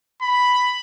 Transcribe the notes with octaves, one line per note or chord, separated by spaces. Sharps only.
B5